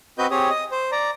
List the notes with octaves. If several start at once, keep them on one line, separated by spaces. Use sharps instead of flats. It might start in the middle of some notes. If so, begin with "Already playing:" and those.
C4 F#4 B4 D#5 G6
C4 G4 G#4 C#5 D#6
D#5 D#6
C5
D5 A#5